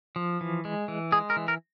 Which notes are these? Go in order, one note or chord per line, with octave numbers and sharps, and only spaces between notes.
F3
E3
G#3
E3
G#3 G#4
A#4
E3
A#4